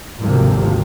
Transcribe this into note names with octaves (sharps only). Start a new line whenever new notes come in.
G#1 D2 C3 F3 A#3